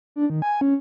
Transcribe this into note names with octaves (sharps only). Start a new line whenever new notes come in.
D4
D#3
G#5
C#4